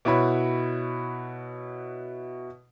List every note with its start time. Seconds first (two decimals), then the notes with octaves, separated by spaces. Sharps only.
0.05 B2 E4 F#4 C#5 B5